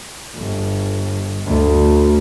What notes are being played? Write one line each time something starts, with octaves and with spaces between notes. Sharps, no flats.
G1
D2